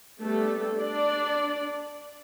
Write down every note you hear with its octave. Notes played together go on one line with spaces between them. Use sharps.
G3 A3 B3 D4 A4
D4 D5